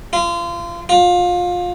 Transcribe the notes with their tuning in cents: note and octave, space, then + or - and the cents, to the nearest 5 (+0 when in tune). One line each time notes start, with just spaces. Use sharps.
F4 -30
F4 +25